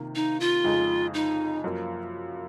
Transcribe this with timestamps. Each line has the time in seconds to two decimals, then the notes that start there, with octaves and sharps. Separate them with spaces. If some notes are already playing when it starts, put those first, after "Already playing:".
Already playing: C3 D#3 A#3 F4
0.15 D#4
0.40 F4
0.64 F2 C#3 G#3 D#4 G#4
1.14 D#4
1.64 F#2 F3 A#3